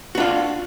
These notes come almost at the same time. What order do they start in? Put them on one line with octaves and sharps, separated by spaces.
F#4 D4 F4